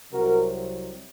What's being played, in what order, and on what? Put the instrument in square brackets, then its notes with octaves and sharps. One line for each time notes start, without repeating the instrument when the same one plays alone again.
[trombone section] C2 C3 F#3 F#4 A#4